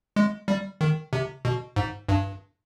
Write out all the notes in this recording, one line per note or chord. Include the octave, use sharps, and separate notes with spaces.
G#3
G3
D#3
C3
B2
G#2
G2